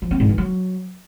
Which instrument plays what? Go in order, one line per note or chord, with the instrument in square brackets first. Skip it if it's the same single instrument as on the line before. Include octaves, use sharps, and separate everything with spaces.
[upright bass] F3
C4
G#2
E3
F#3